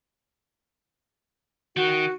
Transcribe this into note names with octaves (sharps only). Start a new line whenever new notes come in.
D#3 F#4